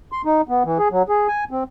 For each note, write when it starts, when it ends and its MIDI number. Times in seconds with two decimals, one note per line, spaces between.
0.12 0.22 84
0.25 0.41 63
0.49 0.63 59
0.65 0.78 52
0.79 0.88 68
0.91 1.03 54
1.09 1.27 68
1.28 1.44 80
1.51 1.63 60